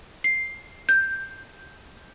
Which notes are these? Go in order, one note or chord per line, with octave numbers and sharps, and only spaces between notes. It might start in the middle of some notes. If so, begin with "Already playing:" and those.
C7
G6